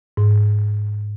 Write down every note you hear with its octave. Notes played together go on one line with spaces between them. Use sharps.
G#2